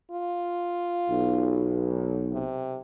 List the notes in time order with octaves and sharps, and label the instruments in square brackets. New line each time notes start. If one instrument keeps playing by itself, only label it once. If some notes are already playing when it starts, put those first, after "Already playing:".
[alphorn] F4
[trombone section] B1
[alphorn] C3